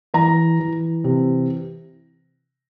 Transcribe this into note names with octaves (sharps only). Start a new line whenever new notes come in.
E3 A#5
E3
C3